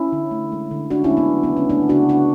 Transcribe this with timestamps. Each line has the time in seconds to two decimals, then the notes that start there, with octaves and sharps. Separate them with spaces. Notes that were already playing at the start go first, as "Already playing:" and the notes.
Already playing: C#4 E4
0.13 D3
0.31 A3
0.52 G#3
0.71 D3
0.90 D3 D4 F#4
1.04 C#4 E4
1.10 G#3
1.17 B3
1.30 F#3
1.43 B3
1.50 C#3
1.57 C#4
1.69 A3 B3 D4
1.89 C#3 D4 F#4
2.09 G#3 D4 F#4